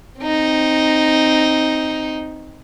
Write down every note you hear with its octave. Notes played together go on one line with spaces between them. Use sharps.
C4 D#4